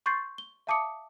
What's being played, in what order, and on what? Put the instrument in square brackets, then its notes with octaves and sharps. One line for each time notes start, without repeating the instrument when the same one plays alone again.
[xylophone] C6 C#6 G6 A6 C7
G7
E5 F5 A5 D6 D#6 C#7